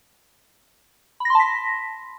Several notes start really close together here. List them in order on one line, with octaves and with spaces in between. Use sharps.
B5 A#6 C6 A5 B6